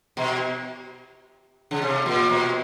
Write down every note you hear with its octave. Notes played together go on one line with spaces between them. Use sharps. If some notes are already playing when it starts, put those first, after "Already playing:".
B2
C#3
C3
A#2
B2